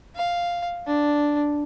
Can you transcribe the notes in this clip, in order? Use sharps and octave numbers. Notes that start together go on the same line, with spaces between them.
F5
D4